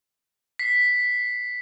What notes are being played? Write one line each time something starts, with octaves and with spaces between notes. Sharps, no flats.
B6 C7